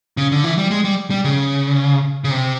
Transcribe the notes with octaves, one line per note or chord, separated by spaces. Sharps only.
C#3
D3
E3
G3
G#3
G3
G3
C#3
C#3
C3